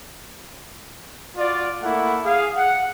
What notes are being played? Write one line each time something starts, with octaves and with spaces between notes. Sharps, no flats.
F4 F#4 D5
A3 A#3 E4 F#5
G#4 F5
F#5